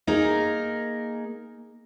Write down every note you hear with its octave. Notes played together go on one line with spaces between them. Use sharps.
A#3 D#4 G#4 A#4